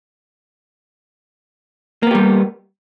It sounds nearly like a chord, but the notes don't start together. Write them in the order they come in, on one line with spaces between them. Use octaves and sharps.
A#3 B3 G4 G3